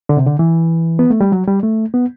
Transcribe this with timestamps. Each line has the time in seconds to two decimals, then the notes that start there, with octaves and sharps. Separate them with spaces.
0.09 D3
0.17 C3
0.26 D3
0.39 E3
0.99 B3
1.10 A3
1.21 G3
1.32 F#3
1.48 G3
1.63 A3
1.94 B3